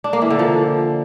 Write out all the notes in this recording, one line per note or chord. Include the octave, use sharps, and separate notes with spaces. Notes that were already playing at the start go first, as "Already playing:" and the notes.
D4
A#3
E3
D3
F3